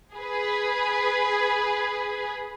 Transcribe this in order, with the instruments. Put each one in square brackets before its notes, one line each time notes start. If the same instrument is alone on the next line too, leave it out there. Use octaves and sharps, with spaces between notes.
[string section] G#4 B4